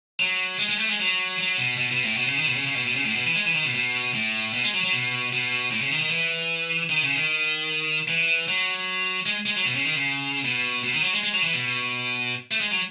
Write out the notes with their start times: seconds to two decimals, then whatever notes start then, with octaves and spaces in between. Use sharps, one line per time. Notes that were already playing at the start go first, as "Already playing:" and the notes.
0.20 F#3
0.59 G#3
0.69 G#3
0.79 A3
0.89 G#3
0.99 F#3
1.39 F#3
1.58 B2
1.77 B2
1.91 B2
2.04 A2
2.17 B2
2.27 C#3
2.37 D#3
2.46 B2
2.56 C#3
2.66 C#3
2.76 B2
2.87 B2
2.95 C#3
3.05 A2
3.16 B2
3.26 E3
3.35 G#3
3.45 E3
3.56 D#3
3.65 B2
3.75 B2
4.14 A2
4.53 B2
4.63 G#3
4.73 F#3
4.83 F#3
4.92 B2
5.33 B2
5.71 A2
5.81 C#3
5.91 D#3
6.01 D#3
6.11 E3
6.90 D#3
7.03 C#3
7.16 D#3
8.08 E3
8.48 F#3
9.26 G#3
9.46 G#3
9.56 F#3
9.65 B2
9.75 C#3
9.86 D#3
9.95 C#3
10.44 B2
10.84 B2
10.94 D#3
11.03 F#3
11.13 G#3
11.23 G#3
11.33 F#3
11.43 E3
11.53 B2
12.51 A3
12.61 G#3
12.71 F#3